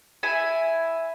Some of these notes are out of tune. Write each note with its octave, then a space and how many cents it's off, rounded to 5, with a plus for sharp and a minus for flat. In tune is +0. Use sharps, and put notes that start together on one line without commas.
E4 +0 G#5 +0